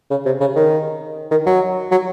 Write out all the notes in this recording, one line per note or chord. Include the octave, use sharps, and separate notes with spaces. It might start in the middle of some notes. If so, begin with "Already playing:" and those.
C#3
C3
C#3
D#3
D#3
F#3
F#3